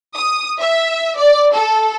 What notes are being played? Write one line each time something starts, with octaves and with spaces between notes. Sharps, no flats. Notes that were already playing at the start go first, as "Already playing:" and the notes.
D#6
E5
D5
A4